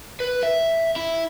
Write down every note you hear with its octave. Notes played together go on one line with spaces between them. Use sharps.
B4
E5
E4